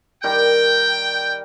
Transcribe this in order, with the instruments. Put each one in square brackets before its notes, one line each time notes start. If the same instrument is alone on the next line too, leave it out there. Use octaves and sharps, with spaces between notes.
[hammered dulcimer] D#3 G3 A#4 [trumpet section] G5